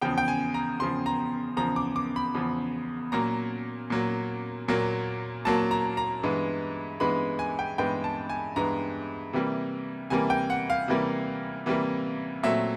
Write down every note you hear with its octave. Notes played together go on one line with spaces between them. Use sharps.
E2 C#3 F3 G5
G5
G#5
A#5
E2 C#3 F3 C6
A#5
E2 C#3 F3 A#5
D6
D6
B5
E2 C#3 F3
A#2 F#3 A#3 A#5
A#2 F#3 A#3
A#2 F#3 A#3
A#2 F#3 A#3 A5
A#5
A#5
G2 E3 G#3 B3
G2 E3 G#3 B3 B5
G#5
G5
G2 E3 G#3 B3 G5
A5
G#5
G2 E3 G#3 B3 A#5
C3 E3 G3 A#3
C3 E3 G3 A#3 G#5
G5
F#5
F5
C3 E3 G3 A#3
C3 E3 G3 A#3
A#2 F#3 A3 C4 E5